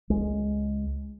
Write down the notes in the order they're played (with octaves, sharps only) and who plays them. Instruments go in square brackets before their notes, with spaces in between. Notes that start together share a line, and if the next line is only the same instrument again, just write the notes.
[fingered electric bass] C#2 G#3